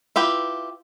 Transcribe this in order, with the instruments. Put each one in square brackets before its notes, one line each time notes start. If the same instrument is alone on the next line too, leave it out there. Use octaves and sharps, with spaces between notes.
[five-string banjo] E4 F4 G4 B4